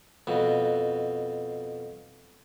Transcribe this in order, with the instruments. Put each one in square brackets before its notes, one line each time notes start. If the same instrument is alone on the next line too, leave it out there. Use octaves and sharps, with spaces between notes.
[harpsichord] F2 B2